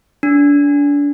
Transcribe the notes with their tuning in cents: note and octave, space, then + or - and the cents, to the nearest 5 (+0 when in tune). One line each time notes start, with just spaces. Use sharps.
D4 -30